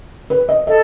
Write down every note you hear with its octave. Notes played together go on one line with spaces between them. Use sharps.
B4
D#5
A4 D#5